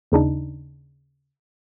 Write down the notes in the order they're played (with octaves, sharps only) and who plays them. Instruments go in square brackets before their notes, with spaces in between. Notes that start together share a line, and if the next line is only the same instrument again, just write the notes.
[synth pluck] D#2 C#3 D4 D#4